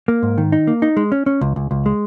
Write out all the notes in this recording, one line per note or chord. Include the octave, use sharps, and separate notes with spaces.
A#3
G#2
D#3
D#4
A#3
D#4
G#3
C#4
C#4
C#2
C#2
C#2
G#3